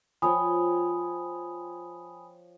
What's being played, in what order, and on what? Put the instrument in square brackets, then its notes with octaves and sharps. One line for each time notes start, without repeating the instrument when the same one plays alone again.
[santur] F3 C#5 G5 [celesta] G#5 B5 D#6